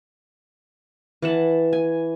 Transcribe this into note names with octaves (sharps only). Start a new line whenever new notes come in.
E3 F#5 A5
G#5